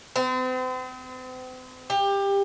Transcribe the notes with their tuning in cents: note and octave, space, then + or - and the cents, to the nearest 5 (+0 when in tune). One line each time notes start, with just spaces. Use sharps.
C4 -40
G4 +20